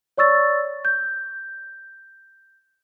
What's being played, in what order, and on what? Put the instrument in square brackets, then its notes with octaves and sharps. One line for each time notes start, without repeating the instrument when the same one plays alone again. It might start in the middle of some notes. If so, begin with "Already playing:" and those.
[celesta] C#5 D5 C#6 E6 A6
G6